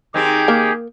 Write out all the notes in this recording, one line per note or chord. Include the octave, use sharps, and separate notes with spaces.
D#3 C4 G4 G#4
A#3